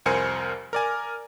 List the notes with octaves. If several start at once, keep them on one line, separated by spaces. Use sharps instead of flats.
C2 F2 A#4 C5 G#5 C#7
A#4 D5 G#5